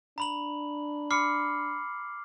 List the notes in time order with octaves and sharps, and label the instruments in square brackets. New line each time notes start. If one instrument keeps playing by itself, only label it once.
[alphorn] D4 [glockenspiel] A#5 B5 F#7
[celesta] B5 C6 C#7 [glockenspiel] D6 F6 C7